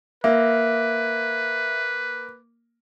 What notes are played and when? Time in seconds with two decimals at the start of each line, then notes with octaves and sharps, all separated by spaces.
0.24 A#3 B4 E5